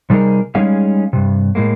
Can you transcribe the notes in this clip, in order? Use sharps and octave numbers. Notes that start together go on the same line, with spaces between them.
C3 G3 D#4 G#4 A#4
G3 G#3 C#4 D#4 G#4 F5
G2 C3
A2 G#3 A#3